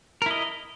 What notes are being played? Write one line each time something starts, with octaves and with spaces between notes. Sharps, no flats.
E4 A#4 D#5